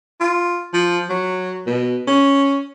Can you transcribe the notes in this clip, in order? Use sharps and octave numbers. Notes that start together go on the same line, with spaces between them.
F4
F3
F#3
B2
C#4